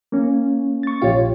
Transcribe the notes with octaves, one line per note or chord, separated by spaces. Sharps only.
A#3 C#4
C#6 A6
A#1 F4 G4 C#5